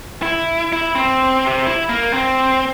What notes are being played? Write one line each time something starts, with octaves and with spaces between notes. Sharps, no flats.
E4
E4
C4
C3
E4
A#3
C4